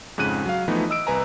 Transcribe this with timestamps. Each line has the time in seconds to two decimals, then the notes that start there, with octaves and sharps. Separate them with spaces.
0.18 F2 G#2 C#3 F#6 D#7
0.46 F#3 F5
0.68 E3 F3 A3 B3 D#4 E4
0.90 D#5 E6 D7
1.07 C2 B4 G#5 A#5